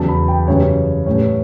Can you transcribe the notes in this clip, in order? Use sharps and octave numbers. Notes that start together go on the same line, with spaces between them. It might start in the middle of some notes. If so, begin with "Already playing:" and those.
Already playing: E2 C#3 F#3 A5
B5
G5
F#2 C#3 E3 G3 C#5
A2 E3 G3 C#5